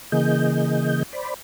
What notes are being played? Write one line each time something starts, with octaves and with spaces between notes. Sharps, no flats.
C#3 E3 A#3 G#4 D#5 G6
C5 D5 B5